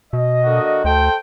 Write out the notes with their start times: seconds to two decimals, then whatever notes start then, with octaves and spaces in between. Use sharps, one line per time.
0.13 B2 D#5
0.43 D3 A#3 F#4
0.84 D2 A4 C5 G5